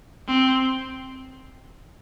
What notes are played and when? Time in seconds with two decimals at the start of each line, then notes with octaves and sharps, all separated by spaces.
0.28 C4